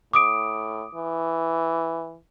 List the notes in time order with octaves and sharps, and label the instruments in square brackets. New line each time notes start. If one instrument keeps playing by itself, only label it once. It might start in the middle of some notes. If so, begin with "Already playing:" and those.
[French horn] A2 [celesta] D6 D#6 D7
[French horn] E3